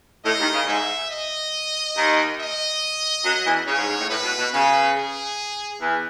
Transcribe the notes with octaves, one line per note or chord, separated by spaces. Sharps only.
A2 D#5
D#2 D#3
C#3
G#2 E5
D#5
D#2 D#3
D#5
F#2 F#3
E2 E3
C#3 C#5
G#2
G#2
A2
A2 B4
B2
B2
C#3 B4
G#4
E2 E3